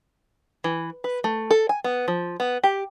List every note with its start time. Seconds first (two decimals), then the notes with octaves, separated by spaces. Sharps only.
0.64 E3
1.04 B4
1.24 A3
1.51 A4
1.69 G#5
1.84 B3
2.08 F3
2.40 B3
2.64 G4